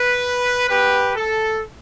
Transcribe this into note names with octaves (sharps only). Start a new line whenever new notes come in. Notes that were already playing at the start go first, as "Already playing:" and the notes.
Already playing: B4
B3 F#4 G4 B4
A4